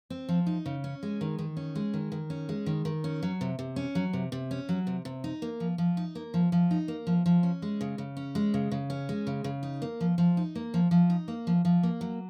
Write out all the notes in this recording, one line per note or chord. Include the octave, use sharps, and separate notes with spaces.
C4
F3
D#4
C#3
C#4
G#3
D#3
D#3
C#4
G#3
D#3
D#3
C#4
G#3
D#3
D#3
C#4
F#3
C3
C3
C#4
F#3
C3
C3
C#4
F#3
C3
C3
D#4
A#3
F3
F3
D#4
A#3
F3
F3
D#4
A#3
F3
F3
C#4
G#3
C#3
C#3
C#4
G#3
C#3
C#3
C#4
G#3
C#3
C#3
D#4
A#3
F3
F3
D#4
A#3
F3
F3
D#4
A#3
F3
F3
A#3
F#3